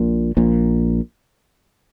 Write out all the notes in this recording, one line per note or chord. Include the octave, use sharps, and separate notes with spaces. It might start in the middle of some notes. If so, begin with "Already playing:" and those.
Already playing: A#1 A#2
A#1 A#2